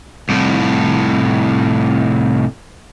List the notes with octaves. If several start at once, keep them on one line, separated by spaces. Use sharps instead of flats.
C2 A2